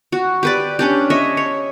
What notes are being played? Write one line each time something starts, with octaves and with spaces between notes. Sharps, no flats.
F#4
G4 B4 D5
C#4 D4 G4
C#5 D#5 E5
C#5